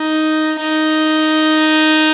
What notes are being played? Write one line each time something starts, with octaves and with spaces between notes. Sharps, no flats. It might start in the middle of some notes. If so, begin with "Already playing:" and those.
Already playing: D#4
D#4